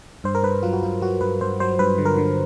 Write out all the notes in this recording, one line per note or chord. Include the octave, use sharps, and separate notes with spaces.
G2 C5
A#4
G2 B4
F#3 F4
F#4
G2 F4
F#3 F#4
G2 B4
G2 C5
F#3 C5
G2 B4
D3
A#4
D3